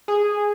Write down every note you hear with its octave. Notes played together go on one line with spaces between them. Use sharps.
G#4